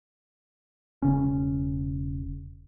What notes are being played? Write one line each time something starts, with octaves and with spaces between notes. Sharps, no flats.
E1 C#3 C#4